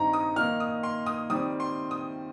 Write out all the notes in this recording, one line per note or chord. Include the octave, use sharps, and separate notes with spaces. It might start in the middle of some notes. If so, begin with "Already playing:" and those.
Already playing: G2 D#3 C4 D#4 A#5
D#6
D#3 A#3 D#4 F6
D#6
C6
D#6
D#3 G3 C4 D#6
C6
D#6